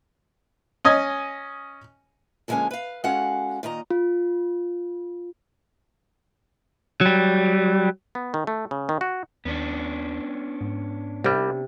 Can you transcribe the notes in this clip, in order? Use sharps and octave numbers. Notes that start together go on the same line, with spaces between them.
C#4 D#5 G#5
F2 D3 G#3 A#3 C#4 G#5
B4 F5
G#3 C#4 F#4 A4 F5 F#5
A#2 D#3 D#5 A#5
F4
F#3 G3
B3
D#3
A3
C#3
D#3
F#4
D#2 B3 C#4 D4
G#2
C2 C3 G3